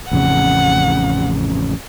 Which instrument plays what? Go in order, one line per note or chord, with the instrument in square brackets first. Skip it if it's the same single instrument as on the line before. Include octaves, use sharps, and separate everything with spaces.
[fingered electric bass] A1 F2 C#3 [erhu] F#5